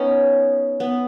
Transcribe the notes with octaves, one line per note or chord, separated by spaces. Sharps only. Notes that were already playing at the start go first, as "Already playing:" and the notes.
Already playing: B3 C#4 D#4
B3